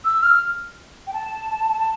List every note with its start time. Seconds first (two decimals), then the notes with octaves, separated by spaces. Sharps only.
0.05 E6
0.23 F6
1.07 G5
1.13 A5
1.78 A5